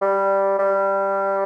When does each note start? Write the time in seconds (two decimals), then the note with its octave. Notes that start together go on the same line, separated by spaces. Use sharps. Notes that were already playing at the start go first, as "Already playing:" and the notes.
0.02 G3
0.59 G3